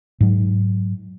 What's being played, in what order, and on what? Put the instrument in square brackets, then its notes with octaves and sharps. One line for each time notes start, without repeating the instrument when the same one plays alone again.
[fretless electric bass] G#2 F#3